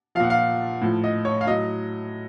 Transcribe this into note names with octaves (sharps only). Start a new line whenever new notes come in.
A#2 F3 F5 F#5
F5
A2 F3
D#5
C#5
F5
A2 F#3 D#5